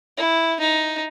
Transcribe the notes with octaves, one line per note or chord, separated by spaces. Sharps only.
E4
D#4